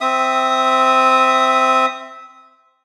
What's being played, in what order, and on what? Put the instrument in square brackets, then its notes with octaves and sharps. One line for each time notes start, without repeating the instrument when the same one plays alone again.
[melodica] C4 E5 D#6